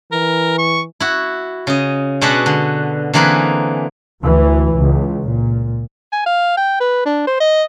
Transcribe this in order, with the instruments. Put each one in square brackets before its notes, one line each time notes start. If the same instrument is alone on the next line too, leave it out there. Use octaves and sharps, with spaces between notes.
[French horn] E3 [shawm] A#4
[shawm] C#6
[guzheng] E4 F#4
C#3 D#5
B2 G#3 D4 F#4 B4 F#5
D3
D3 E3 A#3 C4 G#4 B4
[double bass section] D2 E3
C#2
A#2
[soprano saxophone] G#5
F5
G5
B4
D4
C5
D#5